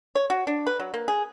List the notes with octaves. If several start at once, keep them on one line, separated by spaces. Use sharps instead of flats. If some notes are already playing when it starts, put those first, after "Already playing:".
C#5
F#4
D4
B4
F#3
A#3
G#4